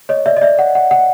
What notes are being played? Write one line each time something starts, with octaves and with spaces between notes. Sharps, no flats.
C#5 D#5
D5 E5
D#5
D5 E5
F#5
F#5
F#5